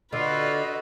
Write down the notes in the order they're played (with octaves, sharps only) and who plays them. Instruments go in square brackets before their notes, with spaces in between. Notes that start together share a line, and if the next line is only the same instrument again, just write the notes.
[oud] D3 [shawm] F4 [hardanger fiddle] F#4 B4 [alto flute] D#5